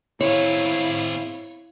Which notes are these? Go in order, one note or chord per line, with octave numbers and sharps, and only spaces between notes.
C4 E4 G#4 C#5 F5